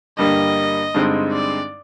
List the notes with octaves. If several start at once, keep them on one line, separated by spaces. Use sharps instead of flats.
G2 D3 G3 A#3 D#5
G2 D3 G#3 C4 D#4
D5